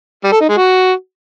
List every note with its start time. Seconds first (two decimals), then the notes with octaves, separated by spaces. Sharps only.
0.23 G3
0.32 A4
0.40 D#4
0.49 G#3
0.57 F#4